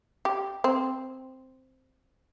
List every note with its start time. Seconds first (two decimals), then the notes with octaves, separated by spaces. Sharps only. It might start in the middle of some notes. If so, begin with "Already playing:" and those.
0.25 G4
0.64 C4